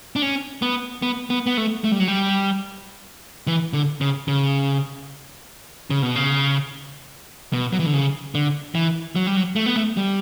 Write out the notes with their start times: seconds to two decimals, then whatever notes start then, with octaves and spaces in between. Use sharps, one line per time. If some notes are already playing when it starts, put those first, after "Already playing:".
0.16 D4
0.22 C#4
0.62 B3
1.02 B3
1.30 B3
1.46 B3
1.57 A3
1.84 A3
1.92 G3
2.00 F#3
2.08 G3
3.47 E3
3.73 D3
4.01 C#3
4.28 C#3
5.90 C#3
6.02 B2
6.16 C#3
7.53 B2
7.73 F#3
7.79 E3
7.86 D3
7.94 C#3
8.35 D3
8.75 E3
9.16 F#3
9.27 G3
9.36 F#3
9.56 A3
9.66 B3
9.76 A3
9.97 G3